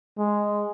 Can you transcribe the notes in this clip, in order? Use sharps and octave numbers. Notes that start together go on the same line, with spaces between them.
G#3